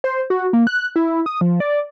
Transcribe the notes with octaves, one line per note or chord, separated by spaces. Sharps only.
C5
F#4
A#3
F#6
E4
D#6
F3
D5